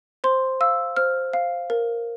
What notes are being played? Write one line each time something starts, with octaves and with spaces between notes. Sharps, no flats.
C5 C6
F5 E6
C5 F6
F5
A#4